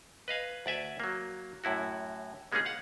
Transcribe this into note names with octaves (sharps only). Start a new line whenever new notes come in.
B4 D#5 F5 G#5
D2 D5 E5 G#5
F#3 A#3
F#2 A2 E4 F#4
G3 G#3 A#3 C#4 D#4 G#4
F5 F#5